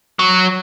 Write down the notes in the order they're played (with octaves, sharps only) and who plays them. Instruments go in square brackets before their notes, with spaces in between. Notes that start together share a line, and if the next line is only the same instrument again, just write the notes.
[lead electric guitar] F#3